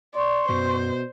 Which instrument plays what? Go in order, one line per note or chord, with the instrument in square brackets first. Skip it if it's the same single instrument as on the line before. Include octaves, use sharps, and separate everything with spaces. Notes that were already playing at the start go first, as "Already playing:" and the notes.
[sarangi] D5 [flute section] C6 C#6
[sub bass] F#2 [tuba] B2 [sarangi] C5